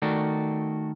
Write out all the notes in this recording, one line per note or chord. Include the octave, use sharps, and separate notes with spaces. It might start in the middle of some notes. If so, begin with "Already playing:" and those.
D#3 A3 F#4 D5